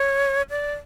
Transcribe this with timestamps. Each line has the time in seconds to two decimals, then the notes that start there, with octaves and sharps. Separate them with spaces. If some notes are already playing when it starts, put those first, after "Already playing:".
Already playing: C#5
0.50 D5